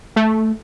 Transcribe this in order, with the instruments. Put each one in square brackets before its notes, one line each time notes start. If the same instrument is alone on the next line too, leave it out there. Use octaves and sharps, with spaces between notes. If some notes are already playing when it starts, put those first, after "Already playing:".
[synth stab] A3